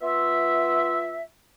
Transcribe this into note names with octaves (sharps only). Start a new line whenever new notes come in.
B3 F4 E5